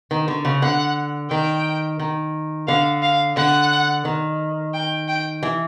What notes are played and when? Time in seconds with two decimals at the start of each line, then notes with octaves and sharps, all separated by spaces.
0.11 D#3
0.28 D3
0.45 C#3
0.62 D3 F#5
1.31 D#3 G5
1.99 D#3
2.67 D3 F5
3.02 F5
3.36 D3 F#5
4.05 D#3
4.74 G5
5.08 G5
5.43 E3